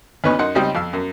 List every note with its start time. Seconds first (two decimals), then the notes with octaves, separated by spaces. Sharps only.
0.24 D2 B3 C#4 D#4 B4 C#6
0.39 F#2 D#4 F#5 C6
0.55 C#2 G3 C4 D#4 G4 D#5
0.75 F2 F5 E6
0.93 F#2